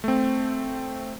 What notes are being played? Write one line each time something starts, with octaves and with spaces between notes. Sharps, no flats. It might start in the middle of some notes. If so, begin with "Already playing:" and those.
A3 C4